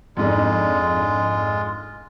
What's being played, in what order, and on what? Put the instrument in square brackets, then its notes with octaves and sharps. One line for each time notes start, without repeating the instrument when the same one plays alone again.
[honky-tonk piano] F2 G#2 D4 [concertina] G#3 F4